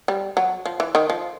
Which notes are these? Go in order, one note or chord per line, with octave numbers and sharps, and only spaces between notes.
G3
F#3
F3
E3
D#3
F3